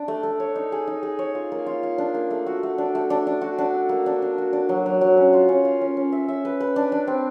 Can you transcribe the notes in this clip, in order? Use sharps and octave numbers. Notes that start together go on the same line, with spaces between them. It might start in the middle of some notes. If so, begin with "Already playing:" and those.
Already playing: D4
A3
A3
C#5
D#4
G#4
D#4
G#4
C#5
F4
A#3
F4
F4
D4
A#3
A3
F#4
A3
D4
A3
D4
D4
F#4
D4
A4
A#3
D4
D4
F#4
D4
F#3
F#3
F#3
C#4
F4
C#4
F4
C#4
C#4
E5
E5
B4
B4
D4
D4
C4